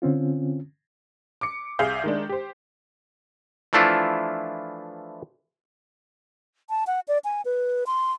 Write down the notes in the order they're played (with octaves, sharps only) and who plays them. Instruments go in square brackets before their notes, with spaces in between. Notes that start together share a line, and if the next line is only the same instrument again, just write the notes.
[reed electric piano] D3 C4 C#4 F4
[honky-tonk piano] D6 C#7
C2 G#4 E5 F5 G6
D#3 G#3 D4
G4 C5
[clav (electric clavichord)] E3 F3 A3 D4 E4 F4
[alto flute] A5
F#5
D5
G#5
B4
C6